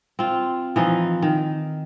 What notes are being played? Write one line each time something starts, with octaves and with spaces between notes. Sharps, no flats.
C4 F4
E3 F3 D#4
D#3